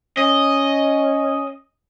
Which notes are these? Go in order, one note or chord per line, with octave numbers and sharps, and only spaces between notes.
C#4 D#5